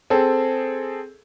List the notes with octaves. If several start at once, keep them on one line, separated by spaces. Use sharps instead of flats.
C4 G#4 A4